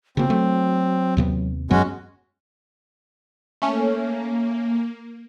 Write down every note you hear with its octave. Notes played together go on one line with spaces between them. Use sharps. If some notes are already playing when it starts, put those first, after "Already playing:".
C#3 A#3 C4 F#4
F#3 A3
D#2 C3 B3
F#2 F#3 G#3 B3 C#4 F#4 C#5
A3 A#3 C#4